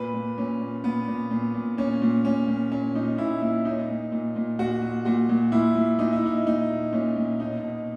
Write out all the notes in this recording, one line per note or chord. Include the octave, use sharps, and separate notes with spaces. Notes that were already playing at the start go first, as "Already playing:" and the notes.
Already playing: A#2 B4
A#2
A#2 C#4
A#2
A#2 B3
A#2
A#2
A#2
A#2 C#4
A#2
A#2 C#4
A#2
A#2 C#4
A#2 D#4
A#2 E4
A#2 E4
A#2 D#4
A#2
A#2
A#2
A#2 F#4
A#2
A#2 F#4
A#2
A#2 E4
A#2
A#2 D#4
E4
A#2 D#4
A#2 D#4
A#2
A#2 C#4
A#2
B2 D#4
B2